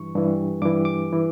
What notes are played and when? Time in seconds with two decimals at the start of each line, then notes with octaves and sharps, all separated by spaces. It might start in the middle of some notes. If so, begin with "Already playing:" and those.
Already playing: G2 E3 C#6
0.15 G2 E3
0.62 G2 E3 D6
0.85 D6
1.13 E3